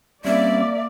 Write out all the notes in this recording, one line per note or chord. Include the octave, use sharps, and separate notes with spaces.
G3 A#3 C4 C#4 D5 E5